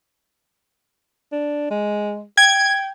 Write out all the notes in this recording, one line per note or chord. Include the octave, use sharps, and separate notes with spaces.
D4
G#3
G5 G#6